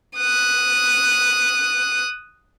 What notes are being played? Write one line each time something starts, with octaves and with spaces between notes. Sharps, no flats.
D#6 F#6